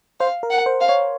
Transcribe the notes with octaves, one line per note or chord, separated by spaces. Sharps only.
C5 F5
A#4
F#5
C5
F5
C#5